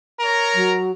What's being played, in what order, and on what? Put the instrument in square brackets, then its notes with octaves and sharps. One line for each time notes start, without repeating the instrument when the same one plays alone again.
[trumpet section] A#4 C#5 A#5
[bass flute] F#3